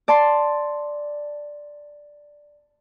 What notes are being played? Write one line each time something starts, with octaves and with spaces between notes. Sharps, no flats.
D5 A5 C6